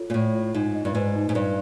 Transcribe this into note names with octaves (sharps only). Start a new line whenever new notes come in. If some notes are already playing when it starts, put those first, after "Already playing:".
Already playing: F4 A4 C#5
A#2
A2 C#5
F4
G#2 D#4
D#5
G2
G#2 B4
D#4
G#2
G2 B4